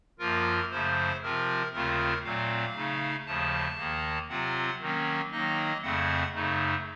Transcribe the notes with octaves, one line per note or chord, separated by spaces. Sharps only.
F#2 F3 A#3 F4 A#4
F#2 C#3 F3 A3 C5
C3 F3 C4 F4 A#4
D#2 C#3 A3 C4 F4 A#4
A#2 F#3 A3 C4 F5
C#3 A3 D#4
D#2 C#3 F3 A3 A5
D#2 D#3 A#3
C3 F#3 C4 F4 F#5
D#3 F#3 A#3 C#4
D#3 F#3 A#3 D#4 D#5
F2 C#3 A3 C4 F#5
F#2 C#3 A3 D#4